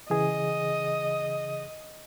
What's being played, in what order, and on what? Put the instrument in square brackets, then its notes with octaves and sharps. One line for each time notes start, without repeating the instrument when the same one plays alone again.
[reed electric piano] C#3 E3 G#4 [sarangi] D#5